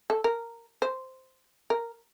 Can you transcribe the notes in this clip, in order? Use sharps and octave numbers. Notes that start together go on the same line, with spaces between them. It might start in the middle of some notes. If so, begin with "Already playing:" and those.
A4
A#4
C5
A#4